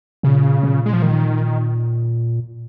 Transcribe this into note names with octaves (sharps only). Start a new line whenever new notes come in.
A#2 C#3
A#2
G#3
F3
D#3